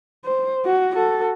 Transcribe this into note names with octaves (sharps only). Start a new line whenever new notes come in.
C5
F#4
F#4 A4